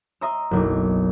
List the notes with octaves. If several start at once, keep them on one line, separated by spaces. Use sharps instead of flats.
D#5 E5 A#5 C6 E6
F#1 B1